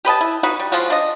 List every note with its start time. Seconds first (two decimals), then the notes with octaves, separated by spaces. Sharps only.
0.05 G4 B4 D#5 A5
0.21 E4
0.43 D#4 F#4 B4
0.60 G3
0.72 F3 G#3 F4 F#4
0.90 D4 D#5